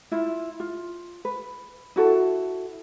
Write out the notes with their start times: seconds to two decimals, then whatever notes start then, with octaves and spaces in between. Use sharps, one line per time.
0.12 E4 F4
0.60 F4
1.25 B4
1.96 E4 F#4 A4